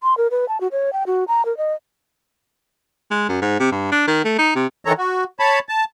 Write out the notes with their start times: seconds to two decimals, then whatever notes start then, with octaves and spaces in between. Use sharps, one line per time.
0.03 C6
0.17 A#4
0.31 B4
0.48 A5
0.61 F#4
0.72 C#5
0.93 G5
1.07 F#4
1.28 A#5
1.45 A#4
1.57 D#5
3.11 G#3
3.29 F#2
3.42 G#2
3.60 C3
3.72 G2
3.92 D4
4.07 D#3
4.25 A3
4.38 D#4
4.56 C3
4.85 D#3 E3 A4 C#5 A#5
4.98 F#4
5.40 C#5 A5 B5
5.69 A5